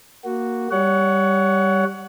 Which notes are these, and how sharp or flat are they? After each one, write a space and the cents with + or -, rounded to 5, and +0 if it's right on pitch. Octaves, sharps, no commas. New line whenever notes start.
A#3 +0 F#4 +0
G3 +0 C#5 +25 F#5 +0